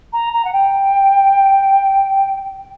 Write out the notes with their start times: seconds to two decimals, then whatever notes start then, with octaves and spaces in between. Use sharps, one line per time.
0.12 A#5
0.33 A#5
0.44 F#5
0.52 G5